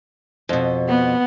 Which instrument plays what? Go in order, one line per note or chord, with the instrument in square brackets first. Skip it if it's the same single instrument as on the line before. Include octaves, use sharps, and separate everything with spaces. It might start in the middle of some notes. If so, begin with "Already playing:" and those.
[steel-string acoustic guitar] F2 B2
[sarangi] B3